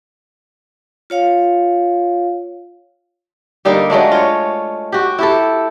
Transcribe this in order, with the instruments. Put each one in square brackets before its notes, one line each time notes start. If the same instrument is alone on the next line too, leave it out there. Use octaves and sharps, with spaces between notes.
[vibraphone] F4 C#5 F5
[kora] D3 G3 A#3 D#4
F#3 G#3 A3 D4
F4 C#5
F#4 G4
E4 G4 A4